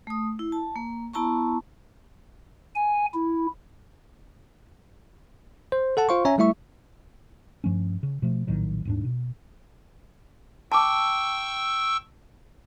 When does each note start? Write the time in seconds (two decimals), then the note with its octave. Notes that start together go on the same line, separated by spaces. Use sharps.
0.07 A3 D#6
0.39 E4
0.52 A5
0.76 A#3
1.14 B3 E4 A5 A#5 C#6
2.75 G#5
3.14 E4
5.72 C5
5.97 A4 F#5 A5
6.09 F4 C5 F5 C6 C#6
6.25 C#4 C#5 E5 G#5 A#5
6.38 G3 A3 E4 E5 C#6
7.64 G2 F3 A3 C#4
8.03 C#3
8.22 B2 F3 A3
8.47 A#1 A2 D#3 F#3
8.85 D#1 G#2 D4
9.05 B2
10.72 G5 A5 C#6 D6 E6